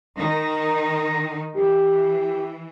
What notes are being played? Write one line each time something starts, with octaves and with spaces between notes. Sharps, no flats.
D#3 D#4 A#6
E3 G4